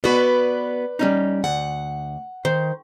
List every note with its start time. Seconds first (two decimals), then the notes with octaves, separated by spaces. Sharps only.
0.04 B3 F#4 B4 D5
0.99 G3 C#4 D#4
1.44 D2 F#5
2.45 D#3 C5